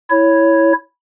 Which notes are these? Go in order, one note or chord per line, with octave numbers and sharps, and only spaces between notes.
E4 C#5